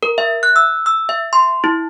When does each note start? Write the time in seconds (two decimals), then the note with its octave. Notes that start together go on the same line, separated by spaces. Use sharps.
0.03 A#4
0.18 E5
0.43 F#6
0.56 E6
0.86 E6
1.09 E5
1.33 C6
1.64 E4